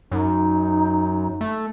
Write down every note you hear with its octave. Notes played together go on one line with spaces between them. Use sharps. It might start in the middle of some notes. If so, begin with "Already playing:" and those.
F#2 D#4
A3